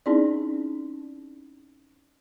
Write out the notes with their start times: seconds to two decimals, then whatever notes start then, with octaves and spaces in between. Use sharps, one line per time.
0.06 C4 C#4 D#4 E4 G#4 D5